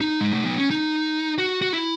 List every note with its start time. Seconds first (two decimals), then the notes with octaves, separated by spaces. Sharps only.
0.01 D#4
0.21 G#3
0.33 A3
0.45 B3
0.58 C#4
0.70 D#4
1.38 F#4
1.61 F#4
1.73 E4